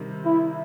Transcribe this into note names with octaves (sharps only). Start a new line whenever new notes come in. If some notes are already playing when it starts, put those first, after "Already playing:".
Already playing: C3 D#3 G3
E4